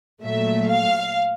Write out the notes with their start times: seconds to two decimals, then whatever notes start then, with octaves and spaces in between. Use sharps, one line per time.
0.23 A#2 F#3 A3 E5
0.69 F5